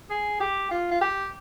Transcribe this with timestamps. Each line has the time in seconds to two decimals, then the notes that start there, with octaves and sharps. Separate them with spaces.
0.10 G#4
0.40 G4
0.71 F4
0.91 F4
1.01 G4